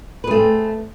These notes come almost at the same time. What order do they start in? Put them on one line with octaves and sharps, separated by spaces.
B4 G#4 A3 C4